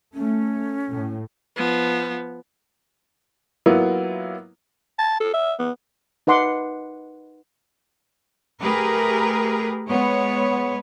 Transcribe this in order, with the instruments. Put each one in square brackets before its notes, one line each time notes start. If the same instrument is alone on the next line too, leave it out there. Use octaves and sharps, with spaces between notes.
[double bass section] A3 [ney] C#4
[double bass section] A2
[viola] F3 B3
[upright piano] F#3 A#3 B3 E4 F4
[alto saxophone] A5
A4
E5
B3
[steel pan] D#4 B4 F#5 C6 D6
[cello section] A3 G4 G#4 A#4 B4
G#3 B3 C#5